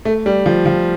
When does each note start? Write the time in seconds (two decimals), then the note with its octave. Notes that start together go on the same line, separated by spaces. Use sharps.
0.05 A3
0.26 G3
0.46 F3
0.66 F3